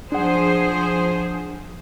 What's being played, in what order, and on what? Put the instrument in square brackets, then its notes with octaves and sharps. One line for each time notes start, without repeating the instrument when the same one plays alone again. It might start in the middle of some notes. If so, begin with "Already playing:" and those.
[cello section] F3 G#4 C5 [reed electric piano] D4 F#5